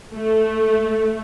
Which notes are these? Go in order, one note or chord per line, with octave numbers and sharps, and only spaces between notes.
A3